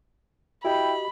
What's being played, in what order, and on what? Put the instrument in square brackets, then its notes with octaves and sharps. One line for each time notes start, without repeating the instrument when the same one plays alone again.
[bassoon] E4 [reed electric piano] F#4 G4 D#5 [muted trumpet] G5 [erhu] B5